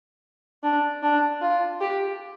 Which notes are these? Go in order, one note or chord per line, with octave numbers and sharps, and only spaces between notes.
D4
D4
F4
G4